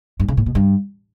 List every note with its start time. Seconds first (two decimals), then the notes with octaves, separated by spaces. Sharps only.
0.20 G2
0.28 C#3
0.37 A2
0.46 B2
0.55 G2